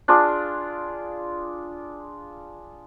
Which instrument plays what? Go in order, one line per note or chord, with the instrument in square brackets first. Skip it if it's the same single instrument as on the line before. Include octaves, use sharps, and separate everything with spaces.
[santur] D4 F4 G#4 D5